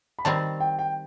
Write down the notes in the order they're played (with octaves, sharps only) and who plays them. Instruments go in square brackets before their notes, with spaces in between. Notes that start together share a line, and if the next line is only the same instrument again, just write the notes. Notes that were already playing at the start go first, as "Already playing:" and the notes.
[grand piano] B5
[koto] D#3 G3 C4 [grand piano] A5
[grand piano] G5
G5